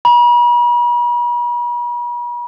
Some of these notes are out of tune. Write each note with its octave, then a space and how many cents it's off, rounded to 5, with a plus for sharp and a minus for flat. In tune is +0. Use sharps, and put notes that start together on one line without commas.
B5 -45